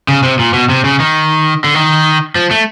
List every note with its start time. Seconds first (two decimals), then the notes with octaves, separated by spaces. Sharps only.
0.08 C#3
0.23 C3
0.39 A#2
0.53 B2
0.69 C3
0.84 C#3
1.00 D#3
1.64 D3
1.74 D#3
2.35 F3
2.51 A3